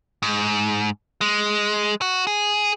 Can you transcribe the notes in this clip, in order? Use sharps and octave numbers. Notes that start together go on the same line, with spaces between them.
G#2
G#3
F#4
G#4